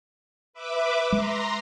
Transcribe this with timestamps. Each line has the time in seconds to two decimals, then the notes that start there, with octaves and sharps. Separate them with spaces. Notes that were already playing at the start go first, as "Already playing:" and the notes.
0.53 B4 E5 D6
1.12 G#3 A#5 C6